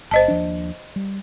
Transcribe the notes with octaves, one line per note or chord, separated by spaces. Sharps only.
G1 C5 D#5 A5
D#2 F3 D4
G3